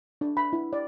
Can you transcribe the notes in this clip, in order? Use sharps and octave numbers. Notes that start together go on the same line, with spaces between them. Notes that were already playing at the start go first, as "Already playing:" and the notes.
D4
B5
E4
D5